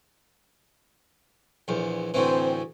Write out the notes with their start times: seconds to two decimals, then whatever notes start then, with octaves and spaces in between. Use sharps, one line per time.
1.68 A#1 E2
2.14 D2 A2 E3 C4 C5